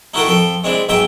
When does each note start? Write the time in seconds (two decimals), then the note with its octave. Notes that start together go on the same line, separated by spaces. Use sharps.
0.14 D#4 E4 F#4 A4 A#4 G5
0.26 F2 A4 G5
0.64 G#3 C4 D4 E4
0.89 B1 G#2 E5 G5 G#5 A#5